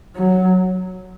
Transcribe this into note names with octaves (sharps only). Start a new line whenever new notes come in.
F#3